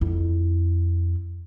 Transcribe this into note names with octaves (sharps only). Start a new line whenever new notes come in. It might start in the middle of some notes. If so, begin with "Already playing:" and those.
F2 E4